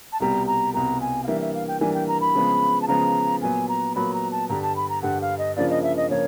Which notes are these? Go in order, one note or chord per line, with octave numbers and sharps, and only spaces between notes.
A5
C2 B2 G3 A#5
A#5
C2 B2 G3 A#5
G#5
F5
E3 G3 A#3 D4 E5
E5
F5
G5
E3 G3 A#3 D4 G#5
G5
A#5
B5
C#3 F3 G#3 B3
A5
C#3 F3 G#3 B3 A#5
A#2 F#3 B3 G#5
A#5
A#2 F#3 B3 B5
A#5
A5
G2 D3 G3 A#5
A5
B5
A#5
G2 D3 G3 F#5
F5
D#5
C#3 F3 A#3 D4 F4 D5
D#5
E5
D#5
C#3 F3 A#3 C#5